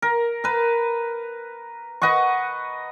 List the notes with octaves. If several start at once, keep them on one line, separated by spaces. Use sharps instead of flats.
A#4
A#4 B4
B4 D#5 F#5 C#6